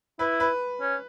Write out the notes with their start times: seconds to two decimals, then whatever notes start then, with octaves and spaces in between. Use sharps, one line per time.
0.19 E4 B4
0.40 B4
0.81 C#4